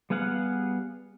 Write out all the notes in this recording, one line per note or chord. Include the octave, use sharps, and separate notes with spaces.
G3 B3 G#4 F5 F#5